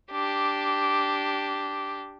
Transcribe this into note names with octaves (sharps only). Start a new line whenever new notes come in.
D4 G4